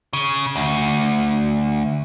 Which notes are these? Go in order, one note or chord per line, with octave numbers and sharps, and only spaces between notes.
C#3
D2